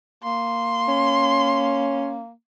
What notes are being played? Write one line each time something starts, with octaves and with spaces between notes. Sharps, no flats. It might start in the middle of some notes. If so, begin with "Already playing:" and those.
A#3 C6
C#4